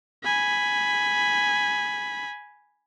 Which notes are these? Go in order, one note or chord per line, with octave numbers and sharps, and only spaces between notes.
G#5 B5